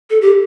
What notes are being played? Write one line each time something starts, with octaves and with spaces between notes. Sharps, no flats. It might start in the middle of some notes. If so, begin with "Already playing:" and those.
A4
G4